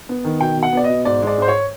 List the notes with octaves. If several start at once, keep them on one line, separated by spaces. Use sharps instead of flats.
B3
D#3
B2 G5
B2
F#5
B3 D5
B2 D#5
G#2 D5
G#3
D5
G#2 C5
C#5